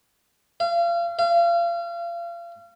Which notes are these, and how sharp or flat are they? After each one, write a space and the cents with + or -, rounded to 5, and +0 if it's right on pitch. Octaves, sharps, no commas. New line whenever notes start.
F5 -35
F5 -35